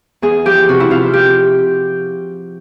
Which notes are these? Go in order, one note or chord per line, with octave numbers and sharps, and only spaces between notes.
E2 G#4
F3 G4
C3 F#4
E4
C3 F4
F3 G4